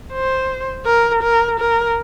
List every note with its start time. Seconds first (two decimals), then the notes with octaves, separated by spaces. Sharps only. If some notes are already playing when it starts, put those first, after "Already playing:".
0.13 C5
0.86 A#4
1.23 A#4
1.60 A#4